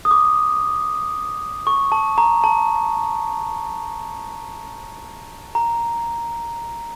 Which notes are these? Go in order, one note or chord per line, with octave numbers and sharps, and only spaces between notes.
D#6
D6
C#6
A5
A#5
A5
A#5